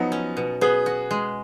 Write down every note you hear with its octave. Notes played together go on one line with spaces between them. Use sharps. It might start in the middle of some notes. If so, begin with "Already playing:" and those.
Already playing: F3 F#3 B3 D#4
C#4
B2
B3 G#4 B4
F#4
G#3